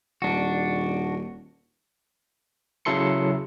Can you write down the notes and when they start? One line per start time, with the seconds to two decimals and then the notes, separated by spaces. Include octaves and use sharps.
0.22 D#1 D4 F#4
2.85 C#3 F#3 E4 A4 C6 C#7